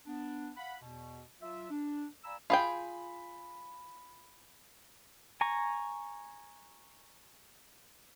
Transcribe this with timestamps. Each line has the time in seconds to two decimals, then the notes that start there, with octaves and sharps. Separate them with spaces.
0.07 B3 D4
0.57 F5 F#5 B5
0.81 E2 B2
1.41 F#3 F4 E5
1.70 D4
2.24 D5 F5 G#5 A#5 B5 E6
2.50 F4 G#4 G5 B5
5.41 G#5 A#5 C#6